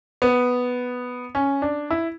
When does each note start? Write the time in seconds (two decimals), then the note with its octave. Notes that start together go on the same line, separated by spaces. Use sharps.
0.22 B3
1.35 C#4
1.62 D4
1.90 E4